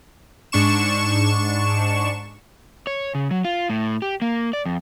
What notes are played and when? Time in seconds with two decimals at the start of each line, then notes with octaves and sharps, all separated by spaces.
0.52 G#2 D4 C#6 E7
2.87 C#5
3.15 C#3
3.31 F#3
3.45 F4
3.70 A2
4.02 G4
4.22 A#3
4.53 D5
4.65 F2